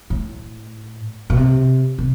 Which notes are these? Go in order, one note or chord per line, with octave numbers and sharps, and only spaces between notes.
A2
B2
C3
C3